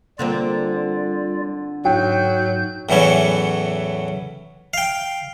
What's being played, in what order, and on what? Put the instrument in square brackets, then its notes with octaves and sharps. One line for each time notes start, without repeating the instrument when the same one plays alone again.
[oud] D3 A#3 C4 [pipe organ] G3 F4 D5
[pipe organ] G#2 G6 [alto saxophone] F#3 [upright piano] G5
[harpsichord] E2 A2 E3 F#3 C#4
F5 G5